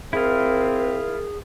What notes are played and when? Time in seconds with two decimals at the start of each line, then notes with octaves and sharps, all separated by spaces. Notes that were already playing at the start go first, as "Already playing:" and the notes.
0.13 C4 E4 F4 G#4 A#4